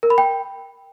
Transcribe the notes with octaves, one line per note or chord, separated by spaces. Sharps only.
A#4
B5
G5